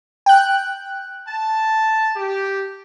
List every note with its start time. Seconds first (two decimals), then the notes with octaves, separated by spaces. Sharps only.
0.26 G5 F#6
1.28 A5
2.16 G4